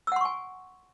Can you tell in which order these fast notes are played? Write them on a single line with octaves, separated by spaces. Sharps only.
E6 F#5 C6 C#6 G#5